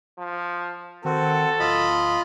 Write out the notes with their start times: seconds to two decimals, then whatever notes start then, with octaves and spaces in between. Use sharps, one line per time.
0.18 F3
1.05 D#3 C4 F#4 A4
1.60 D1 F4 D#5 B5